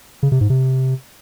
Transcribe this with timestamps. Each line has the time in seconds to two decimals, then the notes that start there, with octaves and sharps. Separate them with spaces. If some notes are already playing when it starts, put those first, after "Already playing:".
0.23 C#3
0.32 C3
0.41 G#2
0.50 C3